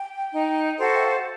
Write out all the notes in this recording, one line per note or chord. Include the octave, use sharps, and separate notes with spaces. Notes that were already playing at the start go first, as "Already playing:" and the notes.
Already playing: G5
D#4
F#4 A4 C5
E5
F5
F#5